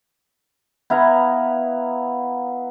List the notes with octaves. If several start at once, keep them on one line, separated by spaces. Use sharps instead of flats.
B3 E4 F5 A#5